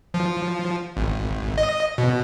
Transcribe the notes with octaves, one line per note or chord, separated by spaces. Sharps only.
F3
G#1
D#5
B2